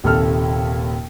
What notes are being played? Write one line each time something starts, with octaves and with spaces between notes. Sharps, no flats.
D#1 D#2 C3 A4 F6